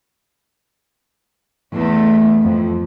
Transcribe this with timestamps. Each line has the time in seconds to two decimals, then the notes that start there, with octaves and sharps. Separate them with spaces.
1.74 E2 A3
2.41 F2